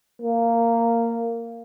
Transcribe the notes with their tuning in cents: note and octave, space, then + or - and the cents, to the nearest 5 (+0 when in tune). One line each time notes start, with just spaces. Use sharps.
A#3 -10